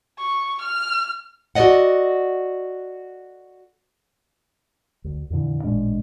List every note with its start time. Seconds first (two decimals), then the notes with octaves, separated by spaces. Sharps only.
0.19 C#6
0.61 F6
1.55 F#4 A4 C5 D5 D#5 F#5
5.04 D2
5.30 F2 A#2 D3 E3
5.63 A1 A#2 G#3 D4